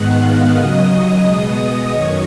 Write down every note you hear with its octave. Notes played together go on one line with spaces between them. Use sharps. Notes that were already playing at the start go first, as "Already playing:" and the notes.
Already playing: G#2 D#3 G#3 B3 F#5 F#6
F5 F6
D#2 C#3 F#3 D#5 D#6
B2 G#3 B3
F#2 D#3 F#3 C#5 C#6